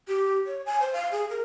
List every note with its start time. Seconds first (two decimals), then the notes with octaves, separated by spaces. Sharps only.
0.08 G4
0.46 C#5
0.66 G#5
0.81 C5
0.93 F5
1.12 G#4
1.30 A#4